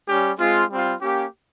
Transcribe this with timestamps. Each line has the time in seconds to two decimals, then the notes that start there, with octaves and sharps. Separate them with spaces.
0.08 G3 C#4 G4
0.39 G#3 C4 F4
0.70 G3 C4 F4
1.01 A#3 C#4 G4